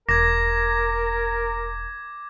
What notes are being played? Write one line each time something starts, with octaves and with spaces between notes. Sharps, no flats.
E1 A#4 D6 G#6 A#6